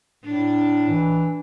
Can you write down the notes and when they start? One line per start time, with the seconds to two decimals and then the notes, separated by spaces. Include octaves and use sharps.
0.24 A2 D4
0.89 E3